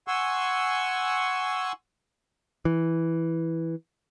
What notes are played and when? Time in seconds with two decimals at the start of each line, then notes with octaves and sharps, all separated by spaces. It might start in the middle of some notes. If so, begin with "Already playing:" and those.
0.08 F#5 G#5 C6 C#6 E6
2.65 E3